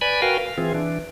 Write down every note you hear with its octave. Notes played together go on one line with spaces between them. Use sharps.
B4 D5 G#5 B5
F#4 A#4 B4 F5 G5 G#5
F5
E3 C4 F4 G#4
E3 D4